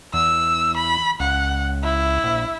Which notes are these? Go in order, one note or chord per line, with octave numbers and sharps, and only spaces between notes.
E2 E6
B5
C#2 F#5
E4
A#1